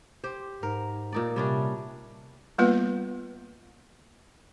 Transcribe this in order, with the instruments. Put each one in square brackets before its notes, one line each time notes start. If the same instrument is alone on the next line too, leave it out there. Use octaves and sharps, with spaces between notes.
[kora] G4 C5
[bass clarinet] G#2 [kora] A#4
[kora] A#2 D#4 D5
[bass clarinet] C3 [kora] G3 C#4 D4
[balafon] G3 A#3 B3 F4 B4